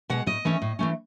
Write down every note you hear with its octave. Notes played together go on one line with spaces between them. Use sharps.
B2 G#3 F#5
A2 D#5
E3 A3 C#4
A2
E3 A3 C#4